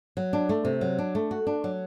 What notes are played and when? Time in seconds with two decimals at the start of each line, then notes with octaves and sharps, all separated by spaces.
0.17 F#3
0.33 D4
0.49 A3
0.65 C3
0.81 F#3
0.99 D4
1.15 A3
1.31 F#4
1.47 D4
1.64 F#3